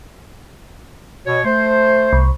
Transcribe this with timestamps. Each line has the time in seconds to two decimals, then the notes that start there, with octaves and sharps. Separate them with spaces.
1.26 B2 C#5
1.45 A3 C5
2.13 C2